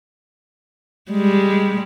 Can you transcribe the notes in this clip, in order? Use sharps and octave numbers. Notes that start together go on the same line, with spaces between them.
G3 G#3